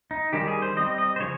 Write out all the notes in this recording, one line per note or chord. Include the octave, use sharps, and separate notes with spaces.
D#4
D#3 G3 C#4 G4
G#4
C5
G3 C4 D#5
D#5
C5
C#3 F3 C#5